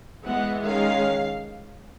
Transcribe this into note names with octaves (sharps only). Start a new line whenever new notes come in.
E3 G#3 B3 F#5
D#3 G#3 C#4 F5